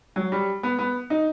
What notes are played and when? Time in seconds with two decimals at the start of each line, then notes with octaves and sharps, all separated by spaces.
0.16 F#3
0.32 G3
0.63 B3
0.79 B3
1.10 D#4